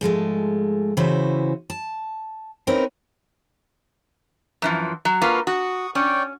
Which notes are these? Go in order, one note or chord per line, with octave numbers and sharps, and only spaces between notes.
G#2 F3 G#3 A3
C#3 E3 E4 F#4 C5
A5
C4 C#4 D#4 E4 A#4 B4
F#2 E3 F3
F#3
A#3 F4 F#4 A4 B4
F#4 C#6 D#6
C#4 C#5 D5 G5